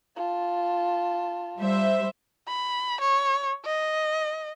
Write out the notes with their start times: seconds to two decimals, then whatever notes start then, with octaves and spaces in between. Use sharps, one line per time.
0.16 F4 A5
1.58 G3 C5 E5
2.48 B5
3.00 C#5
3.65 D#5